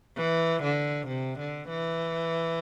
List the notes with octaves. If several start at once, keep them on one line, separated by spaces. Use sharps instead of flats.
E3
D3
C3
D3
E3